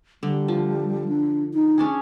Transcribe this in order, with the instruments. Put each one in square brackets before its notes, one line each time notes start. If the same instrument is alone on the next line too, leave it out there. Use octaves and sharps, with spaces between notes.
[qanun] D3 [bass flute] G3
[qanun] F3
[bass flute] D4
D#4
[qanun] C#4 D4 G#4